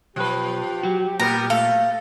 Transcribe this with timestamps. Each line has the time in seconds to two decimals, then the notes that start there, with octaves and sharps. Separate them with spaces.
0.16 B1 F3 G4 B4
0.83 F#3 F#4
1.20 A#2 G3 B3 A#4 A#5
1.50 A3 A4 F5